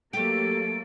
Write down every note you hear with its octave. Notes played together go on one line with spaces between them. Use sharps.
F#3 A3 A#3 G4 A4 D7